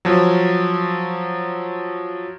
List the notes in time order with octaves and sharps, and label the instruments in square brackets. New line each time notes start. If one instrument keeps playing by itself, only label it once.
[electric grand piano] F3 F#3